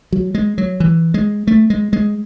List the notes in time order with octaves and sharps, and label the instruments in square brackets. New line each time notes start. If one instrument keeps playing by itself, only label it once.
[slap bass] F#3
G#3
F#3
E3
G#3
A3
G#3
G#3